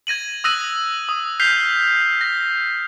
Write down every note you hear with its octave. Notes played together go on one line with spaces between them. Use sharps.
G#6 A#6 D#7 F#7
D#6 E6 F#6 A#6 D#7 F#7
D#6
F6 G6 B6 C7 F7 G7
A#6